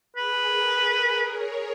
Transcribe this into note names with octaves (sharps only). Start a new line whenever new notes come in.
G#4 B4
A#4
A#4
A#4
C#5